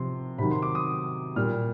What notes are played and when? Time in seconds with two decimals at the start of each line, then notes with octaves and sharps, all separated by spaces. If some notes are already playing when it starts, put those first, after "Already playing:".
Already playing: C3 F3 C6
0.38 C3 D#3 F#3 B5
0.51 C6
0.63 D6
0.75 D#6
1.36 A#2 G3 F6